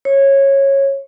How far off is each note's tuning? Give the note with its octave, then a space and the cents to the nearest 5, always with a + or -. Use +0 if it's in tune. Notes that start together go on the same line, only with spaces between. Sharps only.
C#5 -15